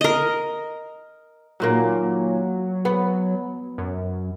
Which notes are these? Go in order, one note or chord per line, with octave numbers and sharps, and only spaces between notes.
A#4 D#5
D#2 A#2 F#3 A#3
B3
F#2